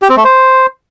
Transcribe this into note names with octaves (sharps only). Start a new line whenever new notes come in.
G4
C4
A3
C5